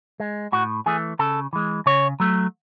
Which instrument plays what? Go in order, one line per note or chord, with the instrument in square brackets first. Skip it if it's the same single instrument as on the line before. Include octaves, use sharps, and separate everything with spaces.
[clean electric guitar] G#3
A2 F#4
E3 A3 G#4
C#3 A4
E3 G#3
C#3 C#5
F#3 A3